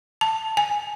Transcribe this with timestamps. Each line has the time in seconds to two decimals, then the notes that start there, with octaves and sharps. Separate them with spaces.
0.21 A5
0.57 G#5